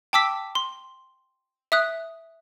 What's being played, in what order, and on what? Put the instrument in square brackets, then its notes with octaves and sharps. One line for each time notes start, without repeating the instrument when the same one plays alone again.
[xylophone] G5 A5 D6 E6 B6
C6
E5 D#6 F#6